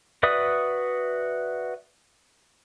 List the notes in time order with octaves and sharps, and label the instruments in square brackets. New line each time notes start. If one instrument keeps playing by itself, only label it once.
[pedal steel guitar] F#4 B4 D5 E5 D#6